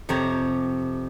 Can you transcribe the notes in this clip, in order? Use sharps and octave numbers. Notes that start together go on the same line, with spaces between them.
F2 C3 G4 C#5 A#5